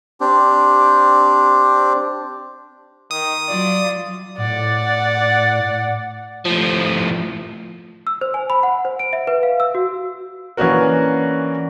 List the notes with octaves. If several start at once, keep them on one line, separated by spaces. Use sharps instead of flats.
C4 D4 G4
D#3 D#6
F#3 F4 D5
A2 D5 F#5
A2 F3
E6
C5
G#5
B5
F#5
C5
D7
E5
B4
F5
E6
F#4
E3 A#3 C#4 D4 F#4 A#4